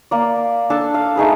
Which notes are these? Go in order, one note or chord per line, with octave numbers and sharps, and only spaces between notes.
A#3 D5
D4 A4 A5
F5
A3 D#4 G#4 B4